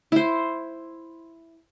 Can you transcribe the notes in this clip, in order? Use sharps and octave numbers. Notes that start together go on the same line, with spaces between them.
E4 C5